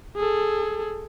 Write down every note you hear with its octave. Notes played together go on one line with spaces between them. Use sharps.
G#4 A4